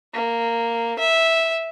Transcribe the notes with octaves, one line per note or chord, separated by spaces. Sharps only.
A#3
E5